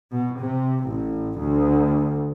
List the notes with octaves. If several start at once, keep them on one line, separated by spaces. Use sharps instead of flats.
B2
C3
A1
D2